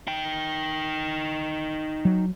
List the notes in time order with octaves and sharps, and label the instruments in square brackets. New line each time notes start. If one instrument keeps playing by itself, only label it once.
[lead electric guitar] D#4 G5
[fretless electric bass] F#3